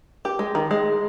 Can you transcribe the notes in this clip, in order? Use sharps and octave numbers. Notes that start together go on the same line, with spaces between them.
G4
G#3
D#3
G#3